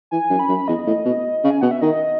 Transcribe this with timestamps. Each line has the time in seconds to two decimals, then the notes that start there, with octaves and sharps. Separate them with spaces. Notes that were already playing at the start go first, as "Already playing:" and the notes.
0.11 E3 G#5
0.30 F#2
0.39 B5
0.49 F#2
0.68 E2 D#5
0.87 A2
1.05 B2
1.44 C#3
1.50 G#5
1.61 B2 F#5
1.71 E5
1.81 D#3 D#5